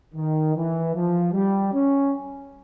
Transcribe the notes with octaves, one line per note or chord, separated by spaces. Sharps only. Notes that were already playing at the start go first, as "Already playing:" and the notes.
D#3
E3
F3
G3
C#4